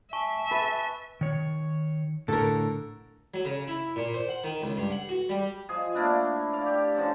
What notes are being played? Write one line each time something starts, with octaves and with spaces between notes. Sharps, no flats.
E5 G#5 A5 C#6
B4 A5 A6 D#7
D#3 C#5
A2 D3 A4 A#4
F#3
C#3
E4
A#2
C5
F#5
D#3
C#2
G2
F#5
F#4
G3
F3 G#4 D#5
A3 A#3 D4 E4
D5 F5
G4
D3 F3 C#4 A4